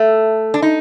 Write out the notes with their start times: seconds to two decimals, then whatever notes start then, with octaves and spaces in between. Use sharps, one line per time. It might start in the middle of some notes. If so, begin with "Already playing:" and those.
Already playing: A3
0.54 D4
0.62 D#4